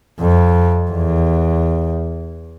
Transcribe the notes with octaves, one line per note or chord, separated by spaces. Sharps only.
F2
E2